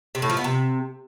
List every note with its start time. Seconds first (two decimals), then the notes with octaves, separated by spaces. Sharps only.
0.15 C3
0.22 A2
0.30 F3
0.37 B3
0.44 C3